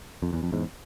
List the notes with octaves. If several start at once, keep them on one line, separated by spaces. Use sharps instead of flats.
F2
E2
F2
E2 G#2